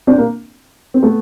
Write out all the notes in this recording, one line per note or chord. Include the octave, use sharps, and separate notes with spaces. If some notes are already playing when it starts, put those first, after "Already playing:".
C4 D4
A#3
C4
A3 B3